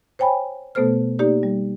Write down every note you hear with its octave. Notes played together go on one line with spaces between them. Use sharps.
C5 C#5 G5 G#5 B5
B2 A3 B3 A4 C5 F6
A#3 D#4 G4 D5
G3